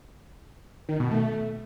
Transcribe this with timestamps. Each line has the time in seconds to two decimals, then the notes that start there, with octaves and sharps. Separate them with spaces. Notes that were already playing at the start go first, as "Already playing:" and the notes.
0.89 D#3
1.00 B2
1.11 A3